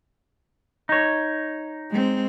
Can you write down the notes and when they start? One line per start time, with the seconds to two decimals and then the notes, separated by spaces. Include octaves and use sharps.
0.89 D#4 C#5
1.90 G#3 C4